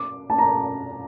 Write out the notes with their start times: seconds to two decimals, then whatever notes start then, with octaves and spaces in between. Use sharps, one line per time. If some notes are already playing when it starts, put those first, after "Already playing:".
Already playing: D6
0.30 A5
0.39 A#5